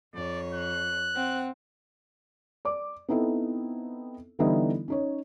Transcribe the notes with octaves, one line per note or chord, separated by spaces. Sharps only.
F2 C#5 D5
F#6
C4 F#5
D5 D6
B3 C4 D#4 E4 A4
D3 E3 G3 B3 D#4 E4
C#4 D#4 C#5